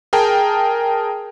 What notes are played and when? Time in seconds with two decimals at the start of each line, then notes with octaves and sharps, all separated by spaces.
0.13 G#4 A#4 G5 A5